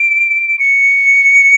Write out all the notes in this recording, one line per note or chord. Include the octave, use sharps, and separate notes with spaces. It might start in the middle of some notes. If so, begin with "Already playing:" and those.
Already playing: D7
C#7